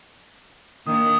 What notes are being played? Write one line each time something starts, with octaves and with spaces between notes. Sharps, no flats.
D#3 A#3 D4 D#6